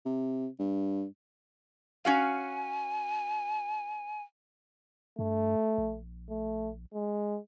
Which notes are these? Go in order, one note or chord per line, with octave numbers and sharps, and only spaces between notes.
C3
G2
C#4 F#4 F5 G#5
G2 A3
A#1
A3
G#3